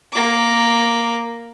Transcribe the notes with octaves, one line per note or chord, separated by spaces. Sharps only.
A#3 D6